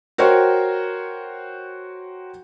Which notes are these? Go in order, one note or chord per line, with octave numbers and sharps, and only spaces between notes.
F#4 A#4 C5 C#5 G5